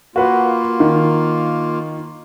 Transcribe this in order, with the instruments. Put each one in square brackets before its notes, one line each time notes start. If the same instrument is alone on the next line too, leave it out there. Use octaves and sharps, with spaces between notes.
[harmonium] A#3 F4 [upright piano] F#4 B4 F#5
[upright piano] D#3